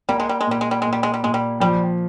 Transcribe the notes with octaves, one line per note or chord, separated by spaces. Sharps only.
G3 A#3
G#3
G3
G#3
A#2 G3
G#3
G3
A#2 G#3
G3
G#3
G3
A#2 G#3
G3
F3 G3